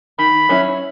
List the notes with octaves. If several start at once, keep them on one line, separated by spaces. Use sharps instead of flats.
D#3 B5
F#3 C#4 E4